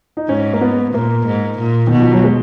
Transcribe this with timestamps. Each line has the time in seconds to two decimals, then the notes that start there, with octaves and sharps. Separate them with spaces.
0.17 D#4
0.29 G#2 C#4
0.53 A#3
0.61 B3
0.93 A#2 A#3
1.27 G#2
1.59 A#2
1.87 B2 D#3
2.00 F3
2.12 F#3
2.24 G#3